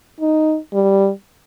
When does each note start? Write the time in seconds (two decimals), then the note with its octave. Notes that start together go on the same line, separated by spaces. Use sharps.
0.21 D#4
0.73 G3